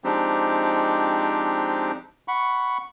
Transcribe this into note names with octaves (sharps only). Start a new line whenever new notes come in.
F3 G#3 C4 D4 D#4 G4
F#5 B5 C#6